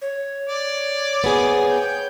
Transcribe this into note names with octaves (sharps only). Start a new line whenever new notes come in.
C#5
D5
B3 G#4 C5
G5